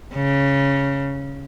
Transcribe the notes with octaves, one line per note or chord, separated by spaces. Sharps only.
C#3